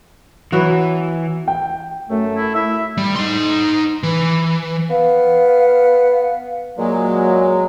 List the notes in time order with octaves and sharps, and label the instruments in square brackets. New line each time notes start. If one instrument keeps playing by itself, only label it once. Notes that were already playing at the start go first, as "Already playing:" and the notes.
[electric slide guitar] E3 [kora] F#3 B3 F#4
[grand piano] G5
[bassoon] F#2 [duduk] A3
[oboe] E4
[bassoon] E4 [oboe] E5
[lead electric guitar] G3
D#4 C6
E3
[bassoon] B3 [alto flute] F5
[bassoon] A#2 [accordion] F#3 G#3 [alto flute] A#3